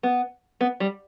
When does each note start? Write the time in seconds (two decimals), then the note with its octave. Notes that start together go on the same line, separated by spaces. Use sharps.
0.03 B3
0.61 B3
0.80 G3